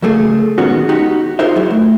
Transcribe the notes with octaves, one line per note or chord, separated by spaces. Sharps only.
C#2 F#3 A3 A#3 G#4
A#2 D#3 G#3 B3 C#4 F#4
D#4 F#4 G4
D#4 F4 G#4 A#4 C5 E5
F#3 E4 F#4
A3